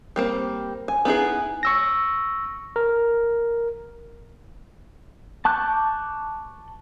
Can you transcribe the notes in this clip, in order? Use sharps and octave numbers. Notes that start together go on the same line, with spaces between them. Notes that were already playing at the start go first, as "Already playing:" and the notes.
G3 A#3 C4
G#5
B3 D#4 E4 G#4
C#6 E6 A#6
A#4
A5 C#6 D6 F#6 G6